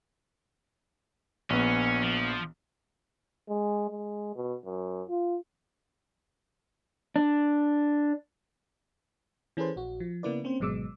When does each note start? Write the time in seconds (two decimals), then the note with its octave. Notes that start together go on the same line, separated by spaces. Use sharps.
1.50 A#1 B3 C#4
2.02 F3
3.49 G#3
3.90 G#3
4.35 B2
4.65 F#2
5.09 F4
7.16 D4
9.57 E3 C#4 G#4 A4 B4 C5
9.76 A#1 F#4
10.00 F3
10.23 C#3 A#3 B3 E4 B4 D5
10.44 A#3 C4 C#4 C5
10.60 G#1 B2 F#3 G#3 D6 E6